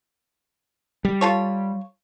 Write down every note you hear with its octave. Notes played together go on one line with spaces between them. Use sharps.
G3
F4 A4 C#5